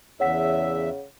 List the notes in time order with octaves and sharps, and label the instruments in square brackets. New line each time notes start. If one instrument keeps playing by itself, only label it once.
[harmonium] E2 E5 [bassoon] C#3 [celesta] C#5 F#5 B6